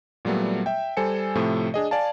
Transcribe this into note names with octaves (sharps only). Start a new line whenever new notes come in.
A#2 F#3 G3 A3 B3
E5 G5
G3 A4 C5 G#5 C#7
A2 C3 F3 A3
D4 G#4 D#5
D5 F5 G#5 A5